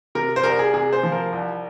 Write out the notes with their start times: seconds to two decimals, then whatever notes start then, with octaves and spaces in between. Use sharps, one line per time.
0.15 C3 A#4
0.36 C5
0.44 C2 A#4
0.59 G#4
0.73 C3 G#4
0.93 C5
1.03 F3
1.12 A#4
1.32 C2